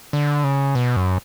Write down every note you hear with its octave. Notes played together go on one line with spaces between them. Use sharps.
D3
C#3
B2
F#2